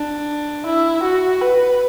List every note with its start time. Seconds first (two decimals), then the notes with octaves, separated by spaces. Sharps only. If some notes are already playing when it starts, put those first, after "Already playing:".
Already playing: D4
0.66 E4
1.03 F#4
1.41 B4